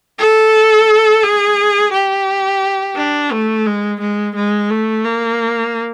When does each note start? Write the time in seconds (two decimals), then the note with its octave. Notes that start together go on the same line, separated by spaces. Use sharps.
0.19 A4
1.23 G#4
1.93 G4
2.97 D4
3.32 A3
3.66 G#3
4.00 G#3
4.36 G#3
4.70 A3
5.05 A#3